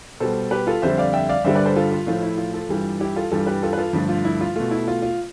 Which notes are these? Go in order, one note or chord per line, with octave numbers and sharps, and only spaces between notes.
B2 G3 A4 C5
G4 B4
F4 A4
F2 D3 G3 C5 E5
D5 F5
E5 G5
D5 F5
G2 D3 G3 C5 E5
B4 D5
A4 C5
F4 A4
F4
A2 F3 A3 F4
E4
F4
F4 A4
G2 E3 G3
E4 G4
F4 A4
G2 E3 G3 F4 A4
G4 B4
F4 A4
B4
F4 A4
G2 D3 F3 A3
F4
E4
F4
B2 A3 F4
E4
F4
F4